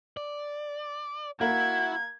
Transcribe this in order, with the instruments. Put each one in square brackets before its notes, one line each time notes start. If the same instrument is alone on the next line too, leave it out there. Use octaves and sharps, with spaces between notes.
[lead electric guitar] D5
[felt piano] A#3 [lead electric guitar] E4 [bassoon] F#4 [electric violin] G#6